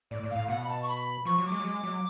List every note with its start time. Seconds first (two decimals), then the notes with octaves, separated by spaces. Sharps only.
0.11 A2 D5
0.23 A2
0.30 F5
0.36 A2
0.48 B2 F#5
0.63 B5
0.68 A5
0.82 C#6
0.87 B5
1.25 F3 C#6
1.38 F#3
1.45 D6
1.52 G#3
1.60 F#3
1.64 G#3
1.84 F#3